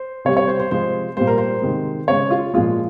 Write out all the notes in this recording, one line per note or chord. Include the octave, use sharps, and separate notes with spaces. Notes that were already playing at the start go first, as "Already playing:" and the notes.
Already playing: C5
C3 G3 C#5
C#5
C5
C5
C3 F3 G#3 C5
A#2 G3 C5
A#4
C5
C3 D#3 G#3
C#3 G#3 C#5
F4
A#2 F3 G#3 F4